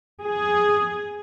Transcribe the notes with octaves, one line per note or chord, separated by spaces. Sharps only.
G#4